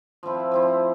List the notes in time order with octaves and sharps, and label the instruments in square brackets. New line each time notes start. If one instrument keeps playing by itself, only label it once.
[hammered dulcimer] F3 C4 E4
F3 C4 E4